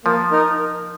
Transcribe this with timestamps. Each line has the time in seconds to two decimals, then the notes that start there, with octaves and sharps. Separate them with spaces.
0.05 F3 A#3
0.31 D#4 A#4